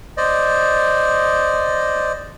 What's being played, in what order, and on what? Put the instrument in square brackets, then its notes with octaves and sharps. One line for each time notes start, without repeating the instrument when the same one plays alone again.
[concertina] C5 D5 D#5